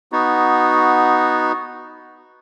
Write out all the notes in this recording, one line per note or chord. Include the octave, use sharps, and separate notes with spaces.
B3 D#4 F#4